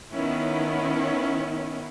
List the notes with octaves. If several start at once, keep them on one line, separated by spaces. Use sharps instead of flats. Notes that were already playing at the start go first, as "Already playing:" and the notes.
D#3 B3 C#4 E4